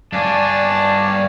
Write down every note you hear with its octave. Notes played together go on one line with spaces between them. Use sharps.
G2 D4 C#5 D5 F5 G#5 A5